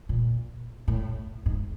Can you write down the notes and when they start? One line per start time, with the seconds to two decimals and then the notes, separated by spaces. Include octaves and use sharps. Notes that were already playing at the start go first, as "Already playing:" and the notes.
0.09 A#2
0.88 A2
1.46 G#2